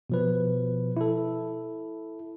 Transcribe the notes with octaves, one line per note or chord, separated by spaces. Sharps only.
B2 F3 B4
E4 A4